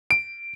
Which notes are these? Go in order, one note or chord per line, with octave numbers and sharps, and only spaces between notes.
D7